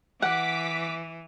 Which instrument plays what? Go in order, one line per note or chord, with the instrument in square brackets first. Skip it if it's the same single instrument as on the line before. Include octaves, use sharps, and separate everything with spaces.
[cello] E3 [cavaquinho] F#5 [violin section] D6 B6